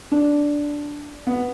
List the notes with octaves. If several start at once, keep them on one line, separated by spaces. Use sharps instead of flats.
D4
B3